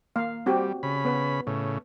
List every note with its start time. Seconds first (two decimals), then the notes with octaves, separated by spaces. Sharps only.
0.16 A#3 F5
0.46 G3 C4 F#4 G4
0.83 C#3 B5
1.05 B3 B4
1.47 A2 C#3